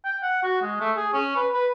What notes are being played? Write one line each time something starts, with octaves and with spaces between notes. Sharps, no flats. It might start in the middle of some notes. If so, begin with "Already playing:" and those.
G5
F#5
F#4
G#3
A3
G#4
C#4
B4
B4